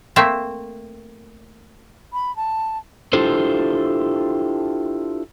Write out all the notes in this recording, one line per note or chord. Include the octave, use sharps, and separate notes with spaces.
A3 A#3 C4 E5
B5
A5
D4 E4 F4 G4 A4 C5